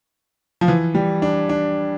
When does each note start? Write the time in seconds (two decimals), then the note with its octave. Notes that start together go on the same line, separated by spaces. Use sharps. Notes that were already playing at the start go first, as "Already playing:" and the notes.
0.61 F3
0.68 E3
0.95 G3
1.22 D4
1.49 D4